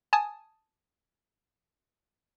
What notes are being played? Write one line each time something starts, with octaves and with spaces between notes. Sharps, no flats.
G#5 A5 D#6